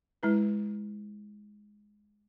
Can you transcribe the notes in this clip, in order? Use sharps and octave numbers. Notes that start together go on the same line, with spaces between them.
G#3 E4 B4